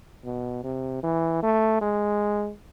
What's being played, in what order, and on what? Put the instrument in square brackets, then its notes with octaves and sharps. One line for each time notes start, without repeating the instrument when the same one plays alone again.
[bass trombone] B2
C3
E3
A3
G#3